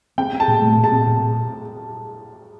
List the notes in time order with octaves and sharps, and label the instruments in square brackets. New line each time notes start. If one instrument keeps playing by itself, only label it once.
[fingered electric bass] C4 [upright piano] G5
[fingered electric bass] C4
[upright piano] A5
[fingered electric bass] A#2
A3
A#2
[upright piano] A5
[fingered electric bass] C4
A#2